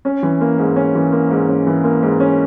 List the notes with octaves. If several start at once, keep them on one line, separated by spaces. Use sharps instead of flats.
C#4
E3
A#3
G#2
C#4
E3
A#3
G#2
C#4
E3
A#3
G#2
C#4